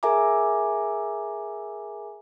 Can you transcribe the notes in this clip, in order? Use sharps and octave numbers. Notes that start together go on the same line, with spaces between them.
G#4 A#4 E5 G#5 A#5 D6